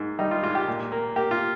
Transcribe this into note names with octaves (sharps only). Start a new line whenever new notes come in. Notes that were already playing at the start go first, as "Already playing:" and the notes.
Already playing: G#2 A#3
G3 D#4
F4
G#2 F4
G4
A#2
A#3
A#3 G4
F4